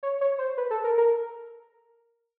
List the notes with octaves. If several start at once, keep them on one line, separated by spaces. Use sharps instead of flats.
C#5
C#5
C5
B4
A4
A#4
A#4